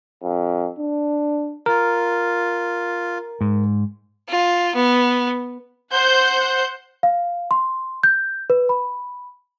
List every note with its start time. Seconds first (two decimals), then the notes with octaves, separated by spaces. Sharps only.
0.23 F2
0.79 D4
1.66 F4 A#4
3.41 G#2
4.29 F4
4.75 B3
5.92 C5 F#5 G6
7.03 F5
7.51 C6
8.03 G6
8.50 B4
8.69 B5